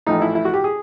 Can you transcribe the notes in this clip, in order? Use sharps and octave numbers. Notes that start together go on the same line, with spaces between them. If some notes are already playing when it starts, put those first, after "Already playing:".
A1 A2 F3 A3 D#4
E4
E4
F#4
G4
G#4